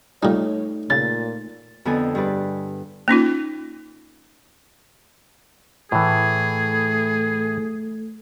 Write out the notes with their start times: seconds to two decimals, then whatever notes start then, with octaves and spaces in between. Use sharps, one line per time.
0.23 A#2 G3 A3 D#4 C#5
0.90 A#2 C#3 A6
1.85 F2 D3 B3 A4 D#5 G#5
2.15 G2 G#4 B4 D5
3.08 A#3 C#4 D#4 F4
5.92 A2 E3 A3 G#4